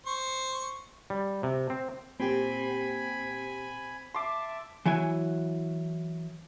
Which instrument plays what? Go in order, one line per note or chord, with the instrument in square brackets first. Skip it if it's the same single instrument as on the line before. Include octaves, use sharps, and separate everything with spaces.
[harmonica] C5 C#6
[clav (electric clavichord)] G3
C3
C4
[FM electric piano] A#2 G4 [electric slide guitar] C4 [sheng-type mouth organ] G#5 B5
[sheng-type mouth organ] E5 A5 [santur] C6 D6
[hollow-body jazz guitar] E3 F#3 E4 G#5